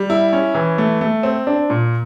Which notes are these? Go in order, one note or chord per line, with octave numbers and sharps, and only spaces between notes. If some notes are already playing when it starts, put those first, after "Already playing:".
Already playing: G3
E4
C#4
E3
A3
A3
C4
D4
A#2